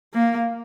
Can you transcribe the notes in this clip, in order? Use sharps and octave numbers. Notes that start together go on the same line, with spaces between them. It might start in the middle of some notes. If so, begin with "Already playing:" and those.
A#3